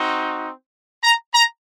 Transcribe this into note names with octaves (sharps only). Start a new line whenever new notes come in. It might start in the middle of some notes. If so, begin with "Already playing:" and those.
Already playing: C4 D#4 F#4
A#5
A#5